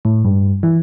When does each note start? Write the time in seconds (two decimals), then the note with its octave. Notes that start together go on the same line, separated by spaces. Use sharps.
0.05 A2
0.25 G2
0.63 E3